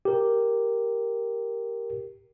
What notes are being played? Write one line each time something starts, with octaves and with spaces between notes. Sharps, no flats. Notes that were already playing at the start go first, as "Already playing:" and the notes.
G4 A#4